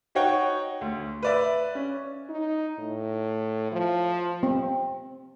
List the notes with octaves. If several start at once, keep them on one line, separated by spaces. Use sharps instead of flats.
D#4 F#4 C#5 F#5 G5
D2
B4 D5 E5
C#4
D#4
A2
F3
C4